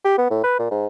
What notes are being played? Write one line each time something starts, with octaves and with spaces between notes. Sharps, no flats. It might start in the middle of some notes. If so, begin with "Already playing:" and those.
G4
B3
A2
B4
A#2
G#2